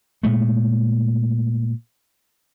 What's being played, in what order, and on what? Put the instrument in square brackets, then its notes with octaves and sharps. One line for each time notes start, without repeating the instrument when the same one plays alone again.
[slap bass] A#2 G#3 A3